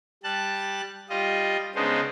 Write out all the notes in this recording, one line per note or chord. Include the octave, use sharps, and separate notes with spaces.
G3 A5 F#6
G3 F4 D#5
C#3 G#3 B3 D4 D#4 C5